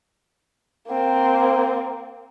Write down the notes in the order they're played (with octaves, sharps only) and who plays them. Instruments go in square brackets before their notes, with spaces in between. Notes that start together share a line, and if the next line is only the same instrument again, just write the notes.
[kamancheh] A#3 C4